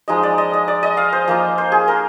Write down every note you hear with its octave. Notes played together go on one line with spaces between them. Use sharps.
F3 G#3 D#4 D#5
D5
D#5
D#5
D5
D#5
F5
C5
F3 A#3 F4
C5
G#4
A#4